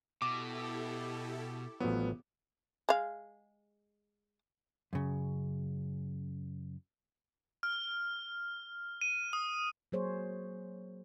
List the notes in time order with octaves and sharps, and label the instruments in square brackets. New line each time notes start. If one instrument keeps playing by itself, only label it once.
[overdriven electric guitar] B2 [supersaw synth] E4 G4 A4 [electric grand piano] D6
[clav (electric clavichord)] A1 F3 F#3 [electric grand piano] B3
[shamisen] G#3 F5
[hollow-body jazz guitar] F#2 C#3
[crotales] F6
D#7
D#6
[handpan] F#3 A#3 G#4 C5 C#5